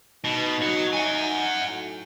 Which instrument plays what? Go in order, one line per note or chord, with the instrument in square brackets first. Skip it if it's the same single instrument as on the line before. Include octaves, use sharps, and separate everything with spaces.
[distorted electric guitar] B2 [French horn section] D#4
[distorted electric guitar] F#3 F#4
F#5 G#5
[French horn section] A2 F#3